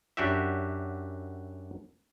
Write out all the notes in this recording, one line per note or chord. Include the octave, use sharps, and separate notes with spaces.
F#2 D4 F#4 G4 E5